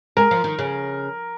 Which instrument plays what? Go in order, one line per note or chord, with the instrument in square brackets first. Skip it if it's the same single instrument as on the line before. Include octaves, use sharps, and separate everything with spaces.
[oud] G#3 [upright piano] A#4
[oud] F3
D#3
C#3